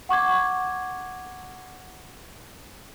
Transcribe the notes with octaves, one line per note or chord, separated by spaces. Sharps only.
F#5 C#6 D6 G#6